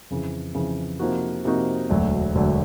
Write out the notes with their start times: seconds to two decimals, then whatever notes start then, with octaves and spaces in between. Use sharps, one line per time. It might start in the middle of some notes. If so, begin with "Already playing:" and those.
0.10 F2 C#3 E3
0.55 F2 C#3 E3
0.99 C3 F3 A#3 D#4 F#4
1.45 C3 F3 A#3 D#4 F#4
1.89 E1 D2 D3 F#3 A3
2.35 E1 D2 D3 F#3 A3